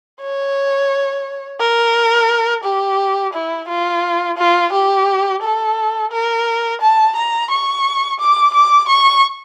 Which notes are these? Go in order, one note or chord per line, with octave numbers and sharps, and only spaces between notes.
C#5
A#4
G4
E4
F4
F4
G4
A4
A#4
A5
A#5
C#6
D6
D6
C#6